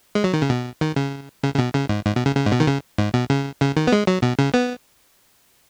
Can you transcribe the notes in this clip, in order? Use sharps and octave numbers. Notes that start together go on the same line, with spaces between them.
G#3
F#3
D#3
C#3
B2
D#3
C#3
C#3
C#3
B2
C#3
G#2
G#2
B2
C#3
C#3
G#2
B2
D#3
C#3
G#2
B2
C#3
C#3
D#3
B3
G#3
F#3
B2
C#3
B3